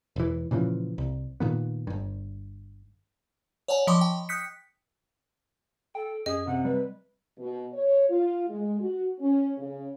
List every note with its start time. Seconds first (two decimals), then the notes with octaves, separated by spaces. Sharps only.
0.16 E1 E3
0.51 A#2 C#3 E3 F3
0.98 C2
1.40 A#2 D#3 B3
1.87 G1 G2
3.68 C#5 D5 F#5 G#5 A5
3.87 F3 D#5 B5 C6 D6
4.01 G5
4.29 D#6 F#6 G6 B6 C#7
5.95 A4 G5
6.26 F#2 G#4 D#5
6.47 C3 F#5
6.65 G3 B4
7.39 B2
7.74 C#5
8.09 F4
8.48 G#3
8.80 F#4
9.20 C#4
9.57 C#3